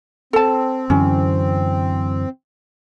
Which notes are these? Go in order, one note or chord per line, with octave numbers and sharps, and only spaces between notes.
C4 A4 A5
F#2 D3 E3 C#4